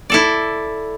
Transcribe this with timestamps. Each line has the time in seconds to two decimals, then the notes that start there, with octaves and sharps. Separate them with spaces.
0.10 E4 A4 D5